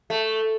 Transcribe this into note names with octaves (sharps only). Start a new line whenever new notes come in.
A3